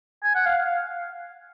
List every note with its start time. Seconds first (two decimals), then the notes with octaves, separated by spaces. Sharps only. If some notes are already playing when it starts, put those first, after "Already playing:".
0.24 G#5
0.35 F#5
0.46 F5
0.65 F5